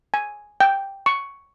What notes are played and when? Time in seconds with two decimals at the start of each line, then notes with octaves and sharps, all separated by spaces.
0.14 G#5
0.60 G5
1.06 C#6